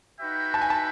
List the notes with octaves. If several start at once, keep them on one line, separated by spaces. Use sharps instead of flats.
D#4 F#4 B4 E5 G5
A5
G#5
A5